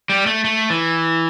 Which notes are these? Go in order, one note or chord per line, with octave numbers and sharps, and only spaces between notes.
G3
A3
A3
E3